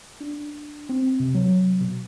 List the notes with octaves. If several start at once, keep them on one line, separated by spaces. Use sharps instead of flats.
D4
C4
C3
F#3
B2